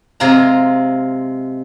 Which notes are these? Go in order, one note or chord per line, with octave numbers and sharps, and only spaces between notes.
C3 G#3 F4 A#5